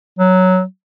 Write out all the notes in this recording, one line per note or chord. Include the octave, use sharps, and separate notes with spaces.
F#3